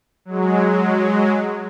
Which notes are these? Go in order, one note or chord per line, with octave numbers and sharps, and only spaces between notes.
F#3 G#3